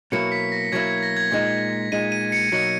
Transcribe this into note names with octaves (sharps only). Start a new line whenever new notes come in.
B2 F#3 A#3 E4 C#7
B6
A#6
B2 F#3 A#3 E4 G#6
G#6
A#6
G#6
A#2 G#3 D#4
A#2 G#3 D#4 D#7
D#7
C#7
B2 F#3 A#3 D#4 C#7